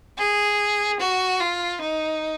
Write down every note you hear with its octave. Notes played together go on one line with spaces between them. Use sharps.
G#4
F#4
F4
D#4